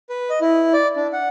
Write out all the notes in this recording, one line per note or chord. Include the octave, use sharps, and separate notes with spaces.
B4
D#5
E4
D5
D4
F#5